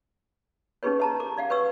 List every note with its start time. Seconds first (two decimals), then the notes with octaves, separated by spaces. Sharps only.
0.83 C#4 D#4 G4 G#4 B4 C#5
1.00 D#5 A5 A#5
1.20 A#4 D6
1.37 D5 F5 F#5
1.50 B4 C#5 C#6 E6